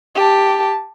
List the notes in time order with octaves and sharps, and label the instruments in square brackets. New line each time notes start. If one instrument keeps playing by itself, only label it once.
[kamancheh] G4 A5